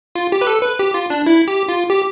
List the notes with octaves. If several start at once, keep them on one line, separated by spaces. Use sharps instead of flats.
F4
G4
B4
A4
B4
G4
F4
D4
E4
G4
F4
G4